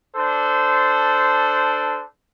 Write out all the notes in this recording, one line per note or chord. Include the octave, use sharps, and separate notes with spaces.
D4 A4 C5